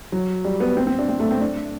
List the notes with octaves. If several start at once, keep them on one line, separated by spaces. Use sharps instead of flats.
F#3
G3
B3
C4
C4
D4
C4
A3
C4
D4